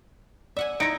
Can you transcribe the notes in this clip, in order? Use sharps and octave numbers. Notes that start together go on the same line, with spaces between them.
D5 E5 F#5 G#5
D#4 E4 A#6 C#7 D7